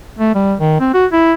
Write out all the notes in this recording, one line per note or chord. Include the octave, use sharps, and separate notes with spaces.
A3
G3
D#3
C4
F#4
E4